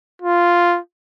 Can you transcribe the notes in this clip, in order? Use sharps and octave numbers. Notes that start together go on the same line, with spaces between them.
F4